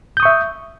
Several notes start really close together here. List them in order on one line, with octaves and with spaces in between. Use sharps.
G6 D#6 C#6 E5